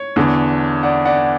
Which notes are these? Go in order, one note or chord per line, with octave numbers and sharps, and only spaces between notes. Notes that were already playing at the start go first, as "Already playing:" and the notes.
Already playing: C#5
E2 D3
D5 F#5
D5 F#5